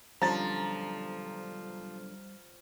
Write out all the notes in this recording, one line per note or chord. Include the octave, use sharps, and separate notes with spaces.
B1 D3 F3 G3 C#4 A#5 A6